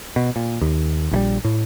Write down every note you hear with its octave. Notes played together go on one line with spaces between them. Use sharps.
B2
A#2
D#2
A#1 E3 G3
A2